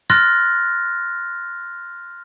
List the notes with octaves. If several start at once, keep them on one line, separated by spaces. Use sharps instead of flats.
C6 F6 F#6 A6 A#6